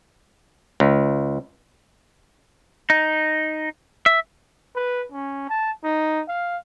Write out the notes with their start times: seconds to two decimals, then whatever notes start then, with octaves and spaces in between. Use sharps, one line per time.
0.80 C#2
2.90 D#4
4.06 E5
4.76 B4
5.12 C#4
5.49 A5
5.84 D#4
6.28 F5